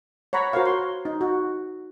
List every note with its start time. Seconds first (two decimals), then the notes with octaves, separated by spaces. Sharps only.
0.33 C#5 F#5 A#5 B5
0.53 F#4 A#4 C5 C#5 F5 C#6
0.66 C6
1.05 D#4
1.21 F#4